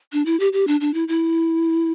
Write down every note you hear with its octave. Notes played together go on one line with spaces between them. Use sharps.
D4
E4
G4
G4
D4
D4
E4
E4